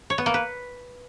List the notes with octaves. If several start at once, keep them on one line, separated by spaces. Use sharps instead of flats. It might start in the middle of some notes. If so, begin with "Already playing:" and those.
C#5
B3
A#3
B4